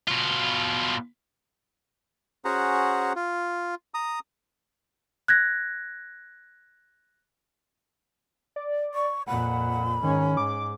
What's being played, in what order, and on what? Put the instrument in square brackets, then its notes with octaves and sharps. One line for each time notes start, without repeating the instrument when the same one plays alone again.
[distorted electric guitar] B2 F4
[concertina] C#4 F#4 G#4 C5 F#5 A#5
F4
A#5 D#6
[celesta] F#6 G#6 A#6
[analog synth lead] D5
[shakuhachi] C#6
[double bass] F2 A#2 [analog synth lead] F#5 [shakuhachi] B5
[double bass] G#2 C#4 [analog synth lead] D#3
[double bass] G#2 [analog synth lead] D6